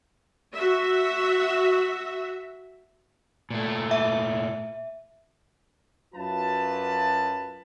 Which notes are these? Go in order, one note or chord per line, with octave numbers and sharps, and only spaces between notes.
F#4 E5
A#2 A3
E5
F#2 F#3 F4 B4 A5